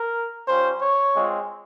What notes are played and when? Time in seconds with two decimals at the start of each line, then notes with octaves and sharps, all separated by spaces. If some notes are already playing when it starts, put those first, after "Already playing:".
Already playing: A#4
0.48 G3 C#4 F4 C5
0.82 C#5
1.16 G#3 C4 F4